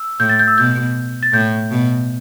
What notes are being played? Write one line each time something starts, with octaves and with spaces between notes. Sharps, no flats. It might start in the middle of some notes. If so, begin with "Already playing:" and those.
Already playing: E6
A2 G6
A6
G6
E6
B2 G6
A6
A2 G6
B2